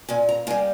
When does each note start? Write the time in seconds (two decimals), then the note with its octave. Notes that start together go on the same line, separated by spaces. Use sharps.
0.09 A#2 G#5
0.29 A#5
0.47 A#3 G#5
0.50 G3